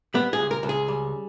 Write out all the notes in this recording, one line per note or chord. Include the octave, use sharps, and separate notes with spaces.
G3 B3
G#4
C#2
A#4
C#2
G#4
G3